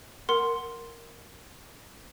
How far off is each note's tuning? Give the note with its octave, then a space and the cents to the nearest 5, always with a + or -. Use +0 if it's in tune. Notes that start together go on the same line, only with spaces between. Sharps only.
A#4 +0 F#5 +0 C6 +0